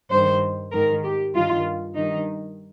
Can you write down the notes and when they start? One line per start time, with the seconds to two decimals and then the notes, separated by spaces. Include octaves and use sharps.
0.11 G2 D#3 C5
0.73 G#2 D#3 A#4
1.03 G4
1.34 G2 D#3 F4
1.96 G2 D#3 D#4